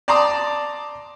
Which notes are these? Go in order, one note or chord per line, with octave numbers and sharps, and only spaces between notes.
D5 A5 A#5 C6 D6 D#6